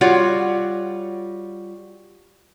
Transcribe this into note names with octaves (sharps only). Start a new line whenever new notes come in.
G3 F4 F#4 C#5